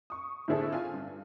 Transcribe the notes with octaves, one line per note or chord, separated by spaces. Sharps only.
C#6 D#6
A2 D3 C4 E4 G#4 A4
F4 G#5
G2